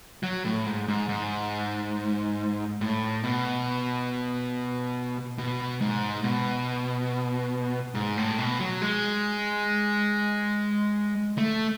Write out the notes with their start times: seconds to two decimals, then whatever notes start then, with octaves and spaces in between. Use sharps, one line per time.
0.23 F#3
0.45 A2
0.66 G#2
0.88 G#2
1.09 G#2
2.81 A2
3.24 B2
5.38 B2
5.81 G#2
6.24 B2
7.95 G#2
8.17 A2
8.38 B2
8.60 F#3
8.82 G#3
11.38 A3